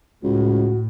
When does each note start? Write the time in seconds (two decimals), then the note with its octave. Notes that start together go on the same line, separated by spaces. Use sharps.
0.24 C#2 A2 F#4